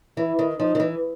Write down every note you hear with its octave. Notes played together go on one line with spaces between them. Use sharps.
E3 E4
D#3
F3 D#4
D#3
E3